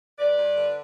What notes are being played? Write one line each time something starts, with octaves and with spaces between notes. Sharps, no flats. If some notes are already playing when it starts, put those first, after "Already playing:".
G2 B4 D5
G2
D3